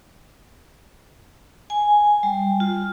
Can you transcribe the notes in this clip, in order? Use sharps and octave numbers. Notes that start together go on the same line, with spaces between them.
G#5
G3
F4